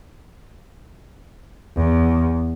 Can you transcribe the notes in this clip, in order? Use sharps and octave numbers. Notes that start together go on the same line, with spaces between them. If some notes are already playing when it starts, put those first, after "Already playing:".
E2